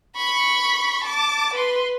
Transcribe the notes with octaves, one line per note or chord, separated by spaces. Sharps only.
B5 C#6
A5 D6
B4 C6